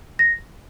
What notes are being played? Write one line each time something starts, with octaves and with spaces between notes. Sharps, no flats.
A#6